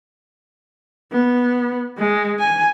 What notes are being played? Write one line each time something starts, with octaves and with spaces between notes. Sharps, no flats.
B3
G#3
G#5